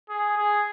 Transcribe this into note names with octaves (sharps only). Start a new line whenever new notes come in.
G#4
G#4